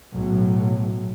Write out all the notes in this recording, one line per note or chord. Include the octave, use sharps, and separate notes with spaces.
B1 A2 F#3